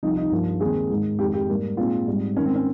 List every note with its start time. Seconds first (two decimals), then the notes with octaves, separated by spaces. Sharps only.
0.03 C2 C3 F3 D#4
0.17 D#4
0.31 G2 F3 A#3
0.60 D#2 D#3 G#3 C4 G#4
0.90 G#2 D#3 G#3
1.19 F2 D#3 G#3 G4
1.34 G4
1.49 G#2 G3 A#3
1.77 A#2 G#3 C4 F4
2.07 G#2 G3 C4
2.36 G#2 D#3 A#3 C#4
2.45 C4
2.55 C#4